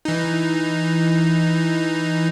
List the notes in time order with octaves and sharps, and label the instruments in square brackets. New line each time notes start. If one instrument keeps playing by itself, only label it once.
[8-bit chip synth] E3 D#4